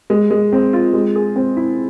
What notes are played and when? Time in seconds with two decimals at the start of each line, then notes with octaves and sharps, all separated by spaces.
0.10 G#3
0.30 G#3
0.52 C4
0.73 F4
0.93 G#3
1.16 G#4
1.36 C4
1.57 E4